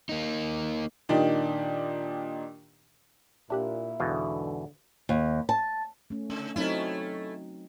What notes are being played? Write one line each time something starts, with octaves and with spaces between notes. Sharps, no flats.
A#3 D#4
A#2 D#3 D4 D#4 G4
A#2 D4 E4 G4 F#6
E2 G#2 B2 D3 F5 G5 D#6
D#2
A5
A3 C#4
C#3 C#4
F#3 A3 C4 C#4 D#4 E4